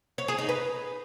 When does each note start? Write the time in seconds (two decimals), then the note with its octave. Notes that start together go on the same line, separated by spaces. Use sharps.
0.18 C#5
0.28 G#4
0.38 D#4
0.49 B4